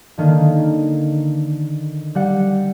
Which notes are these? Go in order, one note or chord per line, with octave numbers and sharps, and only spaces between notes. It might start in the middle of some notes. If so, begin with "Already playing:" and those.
D3 D#3 A#3 D#4
G3 F#5